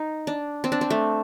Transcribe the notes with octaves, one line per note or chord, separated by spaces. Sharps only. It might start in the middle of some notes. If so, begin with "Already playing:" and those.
Already playing: D#4
D4
C4
D4
C4
A3